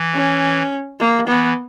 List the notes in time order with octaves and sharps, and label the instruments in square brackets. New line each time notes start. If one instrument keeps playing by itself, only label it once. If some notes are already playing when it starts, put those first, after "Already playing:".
Already playing: [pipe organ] E3
[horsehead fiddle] C#4
A#3
[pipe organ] E3 [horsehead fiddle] B3